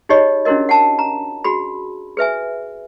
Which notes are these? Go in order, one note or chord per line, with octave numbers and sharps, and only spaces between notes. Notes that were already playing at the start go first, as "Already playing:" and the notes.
D#4 G4 G#4 C#5 D#5 B5
C#4 D4 E4 F#4 A#4 D#5
F#5 G5 A5
A#5
F#4 G#4 B5
G#4 B4 E5 G#5